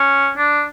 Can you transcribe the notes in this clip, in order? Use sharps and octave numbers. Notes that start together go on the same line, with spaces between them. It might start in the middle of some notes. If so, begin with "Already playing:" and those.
Already playing: C#4
D4